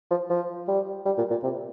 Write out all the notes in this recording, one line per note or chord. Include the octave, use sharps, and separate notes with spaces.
F3
F3
G3
G3
A#2
A#2
C3